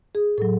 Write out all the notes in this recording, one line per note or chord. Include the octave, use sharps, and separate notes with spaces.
G#4
A2 F#3 A4